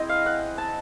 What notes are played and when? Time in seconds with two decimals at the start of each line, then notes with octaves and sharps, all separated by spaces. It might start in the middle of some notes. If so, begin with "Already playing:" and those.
Already playing: C4 E4 G#4 D#5
0.09 F5
0.26 F#5
0.58 A5